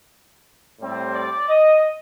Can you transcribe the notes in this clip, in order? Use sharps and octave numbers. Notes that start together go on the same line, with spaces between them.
A2 G3 C4
D5
D#5